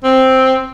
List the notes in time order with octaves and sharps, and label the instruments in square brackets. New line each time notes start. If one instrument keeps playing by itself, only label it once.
[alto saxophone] C4